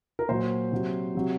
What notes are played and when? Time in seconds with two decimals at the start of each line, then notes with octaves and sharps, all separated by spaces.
0.19 A#4
0.29 A#2 F#3 C5
0.72 C3 F#3
1.15 C3 F#3